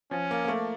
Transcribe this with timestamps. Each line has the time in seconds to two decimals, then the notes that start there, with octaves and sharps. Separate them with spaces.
0.11 F3 C#4
0.31 A#3
0.44 A#3
0.48 A3